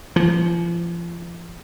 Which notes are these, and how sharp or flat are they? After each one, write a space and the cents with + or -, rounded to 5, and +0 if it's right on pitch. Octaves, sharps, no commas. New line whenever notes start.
F3 -35